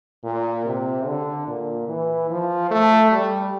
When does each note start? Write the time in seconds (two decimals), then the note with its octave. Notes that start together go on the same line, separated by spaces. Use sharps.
0.24 A#2
0.65 C3
1.06 D3
1.47 A#2
1.88 E3
2.30 F3
2.71 A3
3.12 G3